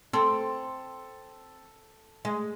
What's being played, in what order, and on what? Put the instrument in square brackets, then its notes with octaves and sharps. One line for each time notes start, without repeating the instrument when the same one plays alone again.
[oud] C4 [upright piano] A4
[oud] G#3